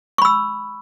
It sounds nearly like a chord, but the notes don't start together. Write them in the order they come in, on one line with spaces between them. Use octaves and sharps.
C#6 B5 E6